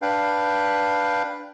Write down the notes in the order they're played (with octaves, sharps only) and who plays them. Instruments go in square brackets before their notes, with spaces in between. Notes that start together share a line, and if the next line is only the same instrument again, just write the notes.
[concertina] D4 B4 F5 G5